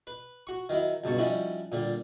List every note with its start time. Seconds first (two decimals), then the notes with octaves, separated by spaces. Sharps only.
0.07 B4
0.47 F#4 C#6
0.69 D#3 F#3 D#4 E4
1.04 C#2 G2 B2 A5 C#6
1.18 F3 G3 C#4 D#4 E4 F#4
1.72 A#2 D3 G3